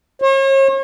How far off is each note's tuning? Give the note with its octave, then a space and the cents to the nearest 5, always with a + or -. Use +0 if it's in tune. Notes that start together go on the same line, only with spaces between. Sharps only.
C#5 -40